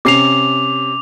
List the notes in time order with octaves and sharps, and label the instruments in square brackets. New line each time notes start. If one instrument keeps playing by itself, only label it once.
[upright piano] C3 C#4 C7 [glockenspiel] D6 F7